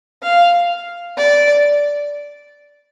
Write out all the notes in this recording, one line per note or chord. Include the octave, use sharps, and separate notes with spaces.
F5
D5